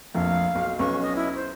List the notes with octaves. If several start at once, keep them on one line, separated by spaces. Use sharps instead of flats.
F1 A#1 F2 F5
B1
B1 C#4 B4 C#6
D#5
E4
C5